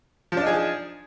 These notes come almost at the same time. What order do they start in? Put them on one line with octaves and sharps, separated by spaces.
F3 D4 D#4 G#4